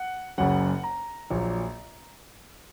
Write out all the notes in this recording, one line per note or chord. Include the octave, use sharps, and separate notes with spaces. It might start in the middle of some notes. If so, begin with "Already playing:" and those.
Already playing: F#5
F#1 F#2 C#3 F#3 F#5
A#5
A#1 A#2 F#3